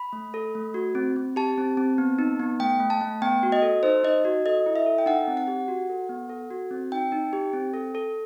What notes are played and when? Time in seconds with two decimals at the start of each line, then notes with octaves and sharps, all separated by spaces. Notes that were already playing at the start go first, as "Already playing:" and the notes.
Already playing: B5
0.13 A3
0.34 A4
0.55 A3
0.74 F#4
0.95 C4
1.16 C4
1.36 G4 A5
1.58 C4
1.77 C4
1.98 B3
2.19 D#4
2.39 B3
2.60 A3 G5
2.80 A3
2.90 A5
3.01 A3
3.22 B3 G5
3.43 F#4
3.52 D#5
3.62 A4
3.83 D#4 C5
4.03 D#4 D#5
4.25 F#4
4.46 A4 D#5
4.66 E4
4.76 E5
4.86 A4
4.98 G5
5.06 D#4 F#5
5.27 C4
5.37 F#5
5.47 G4
5.68 F#4
5.89 A4
6.09 B3
6.30 A4
6.51 F#4
6.71 C4
6.92 D#4 G5
7.12 D#4
7.33 G4
7.53 C4
7.74 A4
7.95 A4